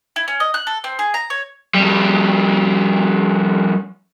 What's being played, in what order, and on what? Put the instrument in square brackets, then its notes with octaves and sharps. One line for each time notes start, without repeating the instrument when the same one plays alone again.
[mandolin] E4
C#4
D#5
F#6
A4
C4
G#4
A#5
C#5
[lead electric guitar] F2 G3